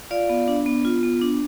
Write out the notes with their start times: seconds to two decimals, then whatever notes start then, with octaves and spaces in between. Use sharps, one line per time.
0.11 F4 D5 F5
0.30 B3
0.48 D4
0.66 B3
0.85 F4
1.03 B3
1.21 D4